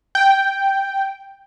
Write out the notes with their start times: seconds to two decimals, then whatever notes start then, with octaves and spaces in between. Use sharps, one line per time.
0.15 G5